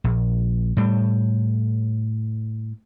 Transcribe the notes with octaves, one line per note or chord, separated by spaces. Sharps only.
A#1
A2 G3